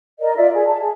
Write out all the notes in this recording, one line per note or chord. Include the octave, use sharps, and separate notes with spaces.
A#4 D5 D#5
F4 D5 E5
G#4
A5
G#4